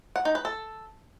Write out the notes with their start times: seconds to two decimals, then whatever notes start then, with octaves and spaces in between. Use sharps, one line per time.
0.16 F#5
0.25 D#4
0.35 B4
0.45 A4